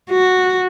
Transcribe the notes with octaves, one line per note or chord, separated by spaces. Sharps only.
F#4